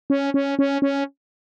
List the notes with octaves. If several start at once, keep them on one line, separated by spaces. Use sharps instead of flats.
C#4
C#4
C#4
C#4